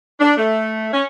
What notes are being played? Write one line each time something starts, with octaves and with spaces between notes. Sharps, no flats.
D4
A3
C#4